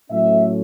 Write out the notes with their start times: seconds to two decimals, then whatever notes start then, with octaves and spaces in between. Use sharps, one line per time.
0.11 A2 F#3 A3 C#4 E5